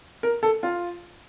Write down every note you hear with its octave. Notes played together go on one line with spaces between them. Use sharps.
A#4
A4
F4